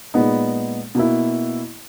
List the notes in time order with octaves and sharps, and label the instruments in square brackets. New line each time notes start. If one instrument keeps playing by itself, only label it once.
[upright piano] A#2 G#3 B3 D#4
B2 A#3 E4